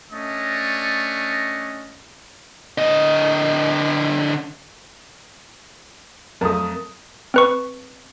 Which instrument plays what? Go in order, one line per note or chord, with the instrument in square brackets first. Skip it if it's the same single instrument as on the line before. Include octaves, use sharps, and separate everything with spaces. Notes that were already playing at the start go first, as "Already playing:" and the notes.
[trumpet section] A3 C#4 D4 D#5
[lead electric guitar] D3 D#5
[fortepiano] F2 A3 [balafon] F#3 [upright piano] A#4 D#6
[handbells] C4 B4 C#6